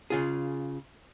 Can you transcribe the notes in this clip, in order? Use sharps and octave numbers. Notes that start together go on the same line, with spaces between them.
C#3 F4 G#4